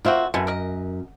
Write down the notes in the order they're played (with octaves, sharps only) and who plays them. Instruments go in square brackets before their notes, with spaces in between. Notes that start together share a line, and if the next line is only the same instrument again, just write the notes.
[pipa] A#3 C4 F#4 [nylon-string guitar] F4 E5
[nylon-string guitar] F#2 [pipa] B2 G#3 A3
[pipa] A#4 D#5